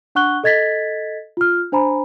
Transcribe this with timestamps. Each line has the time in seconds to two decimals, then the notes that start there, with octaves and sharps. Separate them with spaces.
0.15 D4 F#5 C#6 F#6 G7
0.44 A4 D#5 G#6 A6 B6
1.37 F4 F6
1.72 D4 C5 G#5 A#5 B5